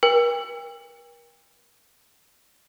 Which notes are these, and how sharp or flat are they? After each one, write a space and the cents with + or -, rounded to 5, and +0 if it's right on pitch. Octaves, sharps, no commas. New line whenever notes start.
A#4 +40 G5 +40